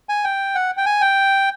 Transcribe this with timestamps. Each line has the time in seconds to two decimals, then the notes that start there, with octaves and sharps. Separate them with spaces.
0.09 G#5
0.24 G5
0.55 F#5
0.77 G5
0.86 G#5
1.01 G5